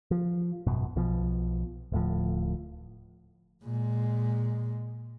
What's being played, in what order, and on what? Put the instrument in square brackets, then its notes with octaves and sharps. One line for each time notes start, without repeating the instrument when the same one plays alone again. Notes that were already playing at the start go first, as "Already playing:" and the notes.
[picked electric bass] F3
G#1 F#2 B2
B1 B2 F3
D1 A2 F3
[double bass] A#2 G#3